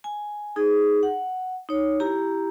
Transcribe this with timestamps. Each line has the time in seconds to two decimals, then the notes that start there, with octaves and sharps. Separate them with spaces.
0.04 G#5
0.56 D#4 G#4
1.03 F#5
1.69 D#4 C#5
2.00 E4 G4 A#5